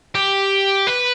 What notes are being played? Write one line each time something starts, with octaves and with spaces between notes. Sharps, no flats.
G4
B4